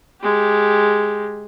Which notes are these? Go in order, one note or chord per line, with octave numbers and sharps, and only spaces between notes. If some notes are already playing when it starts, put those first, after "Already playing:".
G#3 G4